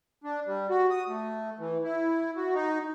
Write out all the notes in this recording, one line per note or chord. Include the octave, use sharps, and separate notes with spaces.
D4
G3
F#4
D#6
A3
E3
E4
F#4
D#4